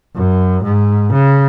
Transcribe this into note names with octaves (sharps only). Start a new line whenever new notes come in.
F#2
G#2
C#3